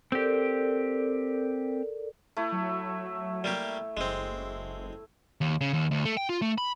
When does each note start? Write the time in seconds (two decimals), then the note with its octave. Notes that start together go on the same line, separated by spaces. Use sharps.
0.12 C4 G4 A4 A#4 D5
2.37 A3 E4
2.52 F#3
3.44 G3 A#3 G4
3.97 F#1 G#3 C4
5.41 D#2
5.61 C#3
5.73 D#2
5.91 D2
6.05 A3
6.17 G5
6.29 F4
6.42 A3
6.58 B5